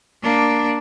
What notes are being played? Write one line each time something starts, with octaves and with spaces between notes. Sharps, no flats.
A#3 D4